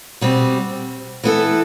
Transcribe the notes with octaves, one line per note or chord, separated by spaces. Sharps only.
B2 G3 C4
E3 B3 E4 A4